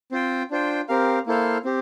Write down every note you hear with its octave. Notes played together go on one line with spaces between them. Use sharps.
C4 F4 C5 G5
D4 F4 C5 G5
C4 G4 A#4 F5
A#3 E4 A4 C5 F5
C4 G4